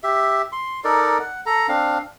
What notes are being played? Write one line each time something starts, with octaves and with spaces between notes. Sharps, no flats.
G4 E5
C6
D#4 A4 A#4 D5
F#5
A4 A#5
C4 D4 F5